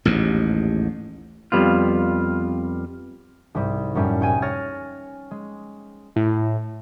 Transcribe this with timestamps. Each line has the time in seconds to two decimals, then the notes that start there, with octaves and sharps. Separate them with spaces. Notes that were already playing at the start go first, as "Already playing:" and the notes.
0.05 A1 D#2 G#2
1.52 F2 C3 G3 B3 F4
3.55 C2 G#2 G3
3.95 F#2 A2 G3 C#4
4.21 C2 G5 G#5 D#7
4.42 C#5 G#5 F6 A6 A#6
5.31 G#3
6.16 A2